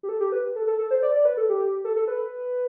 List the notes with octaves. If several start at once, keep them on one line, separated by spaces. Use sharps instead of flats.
G4
A4
G4
B4
A4
A4
A4
C5
D5
D5
B4
A4
G4
A4
A4
B4